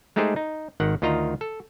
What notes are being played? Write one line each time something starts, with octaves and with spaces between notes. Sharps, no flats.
G#3 A3 D#4 G4 G#4 C5
D#4
G#1 D#3 F#5
D2 D#3 F4 D#5 A#5
A4